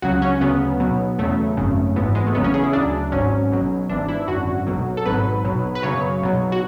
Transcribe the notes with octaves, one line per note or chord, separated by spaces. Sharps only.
C#2 C#3 F#3 F#4
C#4
D2 C#3 F#3 B3
B1 B2 F#3
E2 C#3 F#3 A3
G#1 F#2 C#3
G#1 G#2 E3 B3
G#3
A3
E2 C#3 F#3 B3
C#4
G#4
E4
D2 C#3 F#3 D4
G#1 G#2 F#3 C#4
B1 B2 F#3
G#1 G#2 E3 D4
E4
G#1 F#2 D3 F#4
B1 B2 F#3
A4
G#1 G#2 F#3 B4
B1 B2 F#3
B4
F#2 C#3 F#3 C#5
B1 B2 F#3
F#4